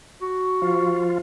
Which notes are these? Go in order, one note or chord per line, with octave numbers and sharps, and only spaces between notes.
F#4
F3 F4